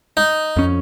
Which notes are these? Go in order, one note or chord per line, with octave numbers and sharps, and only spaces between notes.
D#4
F2 C#4